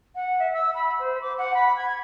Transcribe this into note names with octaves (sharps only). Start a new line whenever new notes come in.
F#5
E5
E6
B5
C5
D6
F#5
B5
G#6